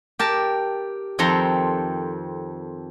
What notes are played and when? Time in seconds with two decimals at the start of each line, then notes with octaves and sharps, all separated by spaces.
0.19 G4 A#4 A5
1.19 F2 D#3 C4 A4 A#5 C6